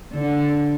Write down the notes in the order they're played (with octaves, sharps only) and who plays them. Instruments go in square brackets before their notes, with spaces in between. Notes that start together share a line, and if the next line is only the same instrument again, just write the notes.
[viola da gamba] D3